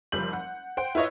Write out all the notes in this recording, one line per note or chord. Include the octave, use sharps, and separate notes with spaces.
F#1 F3 G3 G6 F#7
F#5
C5 F#5 G5
E4 F4 B4 C#5 D#5 E5